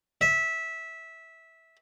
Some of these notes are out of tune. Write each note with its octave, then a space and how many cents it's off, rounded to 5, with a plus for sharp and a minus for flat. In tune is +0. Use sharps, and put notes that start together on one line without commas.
E5 -15